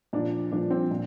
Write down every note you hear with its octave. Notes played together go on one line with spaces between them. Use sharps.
A#2 F3 D4
A#2 F3 D4
C4
A#2